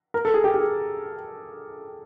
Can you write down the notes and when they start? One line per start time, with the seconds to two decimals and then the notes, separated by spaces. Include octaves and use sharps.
0.14 A#4
0.25 A4
0.34 G#4
0.44 G4
0.54 G4
0.60 G#4